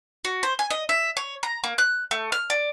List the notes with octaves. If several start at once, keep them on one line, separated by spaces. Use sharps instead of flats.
F#4
C5
G#5
D#5
E5
C#5
A#5
A#3
F#6
A3
F6
D5